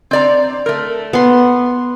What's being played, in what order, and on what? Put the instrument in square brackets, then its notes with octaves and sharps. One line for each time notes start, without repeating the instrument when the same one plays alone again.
[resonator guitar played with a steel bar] C4 D5 A#5
A3 A#4
[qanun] B3 C6